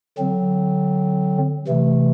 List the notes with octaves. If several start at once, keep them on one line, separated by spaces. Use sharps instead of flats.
D3 F#3 C4
C3 E3 A3